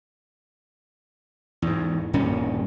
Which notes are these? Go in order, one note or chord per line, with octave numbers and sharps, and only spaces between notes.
E2 G#2
D#1 G2 D#3 C#4